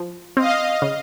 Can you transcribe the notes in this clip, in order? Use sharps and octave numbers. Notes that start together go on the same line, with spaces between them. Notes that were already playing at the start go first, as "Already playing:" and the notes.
Already playing: F3
C4 D#5 F5
C#3